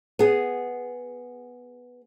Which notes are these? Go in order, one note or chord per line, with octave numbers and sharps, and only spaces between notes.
B3 G#4